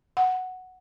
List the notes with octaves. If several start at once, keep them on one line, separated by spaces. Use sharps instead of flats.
F#5